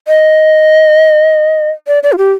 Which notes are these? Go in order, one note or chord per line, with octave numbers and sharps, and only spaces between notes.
D#5
D5
D5
F4
G4